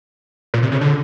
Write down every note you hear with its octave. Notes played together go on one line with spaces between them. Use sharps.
A#2
C3
C#3
D3